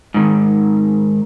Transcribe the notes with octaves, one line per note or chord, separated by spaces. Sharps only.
G#2 D#3